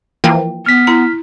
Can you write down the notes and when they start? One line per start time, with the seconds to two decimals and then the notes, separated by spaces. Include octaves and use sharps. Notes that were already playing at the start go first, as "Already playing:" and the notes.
0.24 E3 F3 A#3 G5
0.66 B3 F6 B6
0.87 E4 A#5